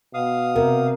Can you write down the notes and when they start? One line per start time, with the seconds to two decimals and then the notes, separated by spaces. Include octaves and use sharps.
0.14 B2 F5 D#6
0.56 C3 A#4